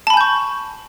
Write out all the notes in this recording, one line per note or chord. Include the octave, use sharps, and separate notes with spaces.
G#5 A5 B5 C#6 G6